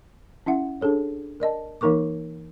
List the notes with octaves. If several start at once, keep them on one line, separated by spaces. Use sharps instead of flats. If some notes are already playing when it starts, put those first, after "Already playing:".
C#4 E4 E5 F#5
D4 G#4 A4 C#5
A#4 D5 D#5 A5
E3 A#3 D#4 A#4 C#6 D6